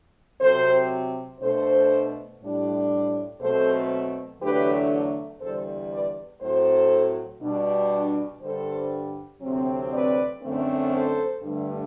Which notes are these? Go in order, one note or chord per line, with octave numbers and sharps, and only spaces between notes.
C3 F#3 C4 A4 C5
B2 A3 D4 A4 C5
A2 G3 D4
B2 F#3 A3 C4 A4 C5
E2 D3 F#3 A3 D4 G4 B4
E2 D3 G3 A4 C5
B4 D5
A2 F#3 C4 A4 C5
B2 G3 D4
G2 D3 G3 A4 C5
D2 C3 F#3 C4
B4 D5
F#2 D3 A3 C4
A4 C5
G2 D3 A3